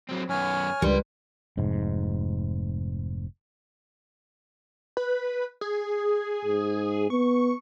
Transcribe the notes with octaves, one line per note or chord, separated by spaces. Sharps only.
F#3 C4
F#2 B3 C#5 G#5 F6
C#2 G3 D4 A#4 B4 C6
F1 G#2
B4
G#4
G#2
B3 C#6